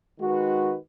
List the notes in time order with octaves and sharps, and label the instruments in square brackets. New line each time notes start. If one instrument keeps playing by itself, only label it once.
[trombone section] D#3 G#3 D#4 F#4 B4